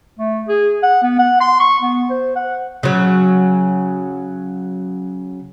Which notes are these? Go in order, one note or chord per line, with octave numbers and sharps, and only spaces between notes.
A3
G#4
F#5
B3
F#5
C6
C#6
B3
C5
F#5
C#3 F#3